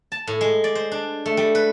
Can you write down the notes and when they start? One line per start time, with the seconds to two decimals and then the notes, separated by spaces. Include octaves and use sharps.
0.12 A5
0.27 A2
0.41 G#3
0.64 D5
0.75 C5
0.92 D4
1.26 A3
1.37 G3
1.55 B4